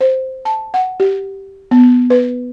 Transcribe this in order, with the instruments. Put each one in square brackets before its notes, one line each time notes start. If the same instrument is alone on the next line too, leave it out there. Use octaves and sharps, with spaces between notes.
[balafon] C5
A5
F#5
G4
B3
B4